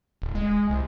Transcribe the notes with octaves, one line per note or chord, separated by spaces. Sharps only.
D1
G#3
C2